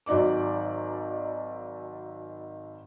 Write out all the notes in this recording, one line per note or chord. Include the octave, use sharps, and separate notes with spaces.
G#1 F#3 D#4 D5 D6